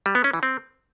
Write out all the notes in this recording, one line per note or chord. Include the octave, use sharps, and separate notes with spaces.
G3
B3
C#4
E3
C4